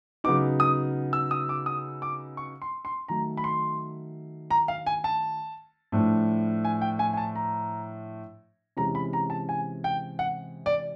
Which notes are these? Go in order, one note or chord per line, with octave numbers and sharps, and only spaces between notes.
C#3 F#3 B3 D#4 D6
D#6
E6
D#6
D6
D#6
D6
C#6
C6
C6
D#3 F#3 A3 A#5
B5
C6
A#5
F5
G#5
A5
A2 F3 A3 D4
G#5
G5
G#5
G#5
A5
A#5
C3 E3 G#3 C#4 A#5
B5
A#5
A5
G#5
G5
F#5
D5